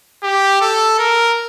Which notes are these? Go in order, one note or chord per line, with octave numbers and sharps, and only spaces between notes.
G4
A4
A#4